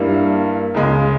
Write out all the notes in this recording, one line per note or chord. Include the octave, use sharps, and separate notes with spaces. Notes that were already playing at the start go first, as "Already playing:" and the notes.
Already playing: G2 G3 A#3 E4
C#2 C#3 G#3